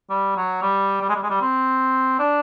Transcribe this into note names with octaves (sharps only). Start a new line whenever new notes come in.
G3
F#3
G3
G3
G#3
G3
G#3
G3
C4
D4